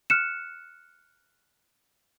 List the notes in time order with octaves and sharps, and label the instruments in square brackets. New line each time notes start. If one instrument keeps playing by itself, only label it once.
[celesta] F6 F#6 C#7 E7